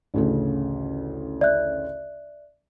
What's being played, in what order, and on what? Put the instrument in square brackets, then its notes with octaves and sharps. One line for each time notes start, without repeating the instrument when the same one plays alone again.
[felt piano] A1 D2 C#3
[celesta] D5 E5 F#6